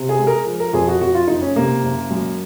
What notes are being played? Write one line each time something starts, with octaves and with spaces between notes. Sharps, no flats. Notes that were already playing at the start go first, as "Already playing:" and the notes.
Already playing: C3
G#4
G#3
A#4
F3
A#4
F2 G#4
F#4
F2 F#4
F4
F#1 D#4
C#4
C3 A#3
F#1
F#2